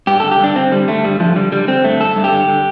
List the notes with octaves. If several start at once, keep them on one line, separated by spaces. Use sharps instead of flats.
G2 G4
D3 A4
G4
G2 D4
D3 C4
D3 G3
D3 A3
G2 G3
D3 F3
D3 G3
D3 G3
D3 C4
G2 A3
G2 A4
G2
G4
D3
D3